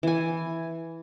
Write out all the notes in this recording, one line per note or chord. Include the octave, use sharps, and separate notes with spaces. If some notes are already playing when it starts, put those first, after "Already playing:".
E3 G#5